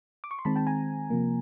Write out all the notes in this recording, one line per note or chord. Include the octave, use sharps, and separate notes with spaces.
D6
C#6
C6
D#3 G#3 C4 A5 B5
G5 A5
G#5 A#5
C3 F3 A#3